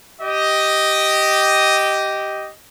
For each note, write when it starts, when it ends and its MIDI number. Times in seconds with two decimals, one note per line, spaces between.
0.21 2.50 67
0.21 2.50 75